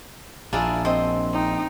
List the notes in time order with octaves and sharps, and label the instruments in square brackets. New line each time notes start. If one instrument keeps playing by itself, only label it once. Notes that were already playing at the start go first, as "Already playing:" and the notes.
[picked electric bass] A#1 [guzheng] D4 E4 [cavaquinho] F4 G#4 A#4
[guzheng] C4 [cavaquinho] D#5
[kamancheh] D#4 G5